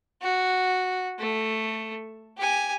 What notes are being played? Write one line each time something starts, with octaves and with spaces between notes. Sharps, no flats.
F#4
A3
G4 G#5